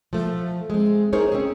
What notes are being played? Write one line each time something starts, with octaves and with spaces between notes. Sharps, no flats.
F3 A3
G#3 C4
D#4 G#4 A#4 C5 C#5
C4 C#4 G#4